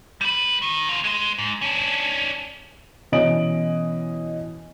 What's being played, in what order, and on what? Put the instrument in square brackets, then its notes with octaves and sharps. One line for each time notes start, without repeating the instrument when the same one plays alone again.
[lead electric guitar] G3 B4
D#3
D#2 F4
G#3 C5
G#2
C#4 D4
[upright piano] B2 E3 C#4 D#5 D7 F#7